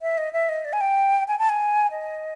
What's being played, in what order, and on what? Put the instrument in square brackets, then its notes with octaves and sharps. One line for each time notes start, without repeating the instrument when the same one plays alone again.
[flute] E5
D#5
E5
D#5
D5
G#5
G5
G#5
A5
G#5
D#5